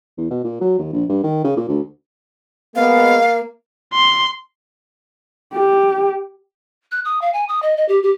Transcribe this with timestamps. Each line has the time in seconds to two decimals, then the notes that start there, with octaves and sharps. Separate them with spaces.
0.18 E2
0.30 B2
0.44 A#2
0.61 F#3
0.78 D#2
0.93 A#1
1.09 G2
1.24 D#3
1.44 C#3
1.57 A#2
1.69 D2
2.76 G#3 A#3 B3 F5
3.94 C6
5.54 G4
6.91 F#6
7.05 D#6
7.21 F5
7.33 G#5
7.49 D#6
7.62 D#5
7.77 D#5
7.88 G4
8.03 G4